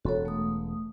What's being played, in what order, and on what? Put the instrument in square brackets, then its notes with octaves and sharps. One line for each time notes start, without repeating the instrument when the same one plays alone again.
[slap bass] E1 [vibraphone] F#4 A4 C#5
[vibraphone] A3 D#6